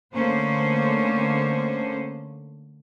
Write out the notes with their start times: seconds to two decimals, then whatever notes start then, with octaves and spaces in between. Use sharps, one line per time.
0.14 D3 A3 A#3 C#4 C5